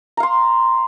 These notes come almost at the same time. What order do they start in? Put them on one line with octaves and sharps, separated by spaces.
A#5 F5 C6